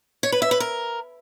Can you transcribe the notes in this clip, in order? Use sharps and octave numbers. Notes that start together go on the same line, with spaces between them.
C#5
B4
E5
B4
A#4